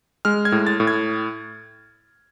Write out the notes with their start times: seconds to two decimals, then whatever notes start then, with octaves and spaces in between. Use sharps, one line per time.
0.25 G#3 F6
0.45 G#6
0.52 A2
0.67 A6
0.80 A2
0.87 G#6